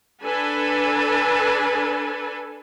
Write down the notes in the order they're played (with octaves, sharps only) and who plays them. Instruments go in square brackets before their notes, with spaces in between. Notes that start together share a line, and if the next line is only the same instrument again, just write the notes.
[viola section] D4 A4 B4 G#5